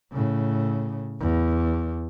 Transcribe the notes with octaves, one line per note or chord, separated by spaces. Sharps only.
A2 C#3
E2